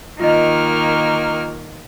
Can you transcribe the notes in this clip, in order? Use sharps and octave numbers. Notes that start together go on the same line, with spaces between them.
D#3 A#3 F4 D#5 F6